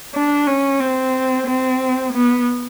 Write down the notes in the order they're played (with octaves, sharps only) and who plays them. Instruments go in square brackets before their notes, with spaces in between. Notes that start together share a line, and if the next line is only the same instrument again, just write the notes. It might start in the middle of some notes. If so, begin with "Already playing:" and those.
[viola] D4
C#4
C4
C4
B3